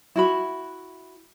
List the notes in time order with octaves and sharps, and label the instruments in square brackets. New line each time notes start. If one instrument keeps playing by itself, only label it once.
[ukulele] E4 F#4 B5